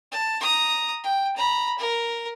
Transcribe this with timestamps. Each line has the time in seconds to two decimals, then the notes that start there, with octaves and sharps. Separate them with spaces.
0.12 A5
0.40 A#5 D#6
1.04 G5
1.37 A#5 B5
1.79 A#4